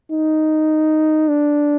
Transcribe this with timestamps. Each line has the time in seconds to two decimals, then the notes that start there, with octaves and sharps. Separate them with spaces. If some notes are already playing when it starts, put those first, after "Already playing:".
0.12 D#4
1.28 D4